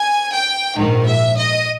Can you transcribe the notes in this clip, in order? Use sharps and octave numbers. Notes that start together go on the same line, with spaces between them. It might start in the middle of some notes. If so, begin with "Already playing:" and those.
Already playing: G#5
G5
A#1 G#2 D#3
E5
D#5